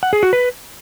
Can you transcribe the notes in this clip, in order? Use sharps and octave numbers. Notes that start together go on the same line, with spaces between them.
F#5
G#4
F#4
B4